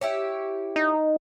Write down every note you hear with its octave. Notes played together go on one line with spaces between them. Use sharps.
E4 G4 C#5
D#4